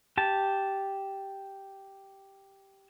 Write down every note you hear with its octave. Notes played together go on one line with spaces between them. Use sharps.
G4 A5